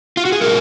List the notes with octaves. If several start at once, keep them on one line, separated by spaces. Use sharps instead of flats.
F4
F#4
G#4
A#2 G#3 C#4 A#4